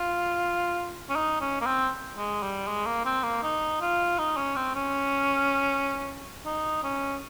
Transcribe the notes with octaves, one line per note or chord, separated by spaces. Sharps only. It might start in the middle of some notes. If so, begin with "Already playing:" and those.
Already playing: F4
C#4
D#4
C#4
A#3
C4
G#3
G3
G#3
A#3
C4
A#3
D#4
F4
D#4
C#4
C4
C#4
D#4
C#4